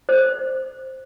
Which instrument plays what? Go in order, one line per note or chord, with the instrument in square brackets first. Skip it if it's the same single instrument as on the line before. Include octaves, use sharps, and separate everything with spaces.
[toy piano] C5